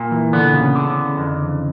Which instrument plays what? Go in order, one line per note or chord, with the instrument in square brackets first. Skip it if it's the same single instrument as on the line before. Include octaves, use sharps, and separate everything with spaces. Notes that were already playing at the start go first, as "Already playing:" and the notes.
Already playing: [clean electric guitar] A#2
[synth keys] E3
[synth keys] D3 [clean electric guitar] B3
[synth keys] C#3
[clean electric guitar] D3
F2